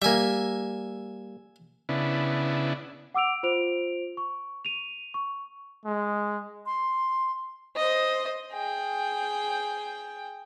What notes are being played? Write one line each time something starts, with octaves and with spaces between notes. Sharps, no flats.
G3 A#3 E5 G#5
C#3 B3 D4 E4
F#5 D6 E6 D7 F7
F4 C5 D7 F7
C#6
D#7 F7
C#6
G#3
C6
C5 D#5
G#4 G5